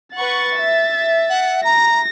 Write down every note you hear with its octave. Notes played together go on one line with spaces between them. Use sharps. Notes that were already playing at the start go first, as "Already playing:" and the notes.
B4 F#5 C#6 A6
E5
F#5
A#5 A#6